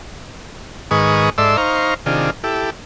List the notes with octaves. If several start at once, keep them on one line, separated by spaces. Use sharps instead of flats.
G#2 D#3 G#4 B4 C#6 D#6
G#2 A4 D5 E5 C6 E6
D#4 C5 F5 A#5 C#6
C3 D#3 D4 F4 G#4
E4 G4 A4